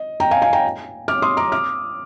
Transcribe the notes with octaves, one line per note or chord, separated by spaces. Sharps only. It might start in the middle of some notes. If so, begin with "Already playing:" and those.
Already playing: D#5
G5 A#5
F5 G#5
F5 G#5
G5 A#5
D6 F6
C6 D#6
A#5 D6
D6 F6